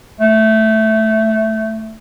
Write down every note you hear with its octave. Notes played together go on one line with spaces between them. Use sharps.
A3